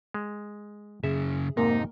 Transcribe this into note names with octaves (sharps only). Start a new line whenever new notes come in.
G#3
F#2 C#3 G#4 E5
F2 G#2 C3 A#3 D#4 A#4